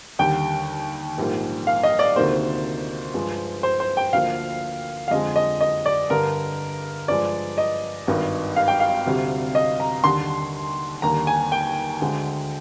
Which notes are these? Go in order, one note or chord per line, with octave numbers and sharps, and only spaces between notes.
D#2 D3 G3 G5
A#1 G#2 G3 A#3
F5
D#5
D5
D2 C3 D#3 A#3 C5
G2 F3 G#3
C5
C5
G5
D2 D3 F3 A#3 F5
F5
F2 D3 G#3 D#5
D#5
D#5
D5
G2 D3 G3 A#4
G2 F3 G#3 D5
D#5
G#1 G2 D#3
F5
G5
F5
D2 C3 G3
D#5
A#5
D#2 D3 G3 C6
D#2 D3 G3 A#3 A#5
G#5
G5
D2 D3 G#3